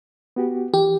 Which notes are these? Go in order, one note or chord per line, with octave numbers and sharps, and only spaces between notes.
B3 F#4 G4
E3 G4